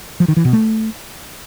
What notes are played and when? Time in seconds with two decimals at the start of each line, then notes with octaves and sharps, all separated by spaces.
0.20 F3
0.28 D#3
0.37 E3
0.45 B2
0.53 A3